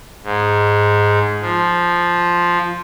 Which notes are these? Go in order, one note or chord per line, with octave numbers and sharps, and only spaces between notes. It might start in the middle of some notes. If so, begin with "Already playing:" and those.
G#2
F3